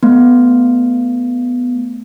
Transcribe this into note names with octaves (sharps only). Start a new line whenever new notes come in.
A3 B3